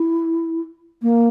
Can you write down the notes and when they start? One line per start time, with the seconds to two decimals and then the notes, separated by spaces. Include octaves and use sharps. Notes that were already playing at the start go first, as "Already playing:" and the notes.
Already playing: E4
1.02 A#3